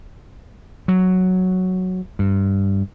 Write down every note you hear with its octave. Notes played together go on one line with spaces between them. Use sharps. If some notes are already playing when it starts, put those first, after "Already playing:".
F#3
G2